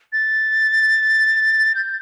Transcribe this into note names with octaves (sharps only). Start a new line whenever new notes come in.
A6
G6